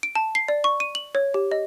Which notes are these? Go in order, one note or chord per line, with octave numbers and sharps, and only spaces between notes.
D7
A5
C7
D5
C#6
D#7
F#7
C#5
G4
D#5